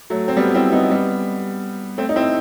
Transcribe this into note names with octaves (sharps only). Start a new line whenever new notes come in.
F#3 A3
C4
G3 B3
C4 E4
B3 D#4
G3 B3
A3 C4
D#4
C4 E4